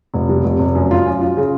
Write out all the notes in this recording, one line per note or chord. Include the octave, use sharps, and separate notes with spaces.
F1
C3
F1
F1
F#2
F4
F#2
F4
C#3